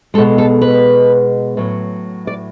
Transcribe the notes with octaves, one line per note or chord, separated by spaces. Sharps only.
B2 G#3 A4
A4
B4
A2 F#3
D5